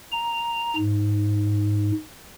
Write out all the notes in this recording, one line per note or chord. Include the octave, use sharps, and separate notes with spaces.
A#5
G#2